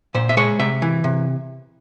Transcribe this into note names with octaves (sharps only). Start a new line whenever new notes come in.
A#2 C5
E5
G#3 C#5
C3 E5
E3
C3